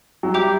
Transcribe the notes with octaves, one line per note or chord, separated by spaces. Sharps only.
F#3
G3 E5 G5 A#5 D6 G6